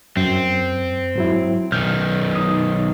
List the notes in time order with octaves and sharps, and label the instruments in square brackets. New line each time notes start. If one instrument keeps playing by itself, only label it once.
[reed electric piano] F#2 [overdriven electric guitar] C4
[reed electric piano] G#2 F#3 E4
[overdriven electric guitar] B1 D#3 [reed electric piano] F6 G6
[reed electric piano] D#4 D#6